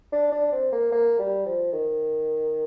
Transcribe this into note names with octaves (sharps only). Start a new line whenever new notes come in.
D4
D4
C4
A#3
A#3
G3
F3
D#3